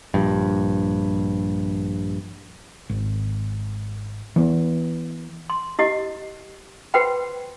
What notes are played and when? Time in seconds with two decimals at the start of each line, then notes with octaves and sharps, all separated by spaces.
0.14 A#1 G2
2.90 G#1
4.36 E3 B3
5.50 C6
5.79 E4 G4 D#5
6.94 F#4 B4 C5 G5 B5